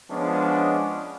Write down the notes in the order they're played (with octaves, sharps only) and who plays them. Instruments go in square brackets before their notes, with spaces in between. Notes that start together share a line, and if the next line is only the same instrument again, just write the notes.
[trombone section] F3 G#3 B3 C#4 D4